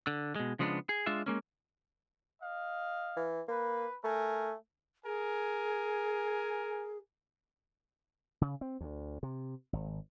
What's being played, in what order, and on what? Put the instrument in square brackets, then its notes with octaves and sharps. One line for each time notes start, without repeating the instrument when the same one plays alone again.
[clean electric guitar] D3
B2 G#3
C#3 F3 G#3 B3 C4 D4
G#4
G#3 D4 F4 E5
G#3 A#3 C#4
[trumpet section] D#5 F5
[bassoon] E3
[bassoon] A#3 [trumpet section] B4
[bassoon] A3 [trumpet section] A#4 G#5
[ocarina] G#4 [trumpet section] A#4 G#5
[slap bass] C#3
C4
D2
C3
G#1